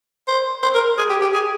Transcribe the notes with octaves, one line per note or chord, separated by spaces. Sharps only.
C5
C5
A#4
G#4
G4
G4
G#4